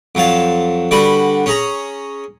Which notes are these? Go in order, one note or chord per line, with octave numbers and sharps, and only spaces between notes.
F2 F#3 F5 A5
D3 G3 F#4 B4 B5
C#4 G#4 A#5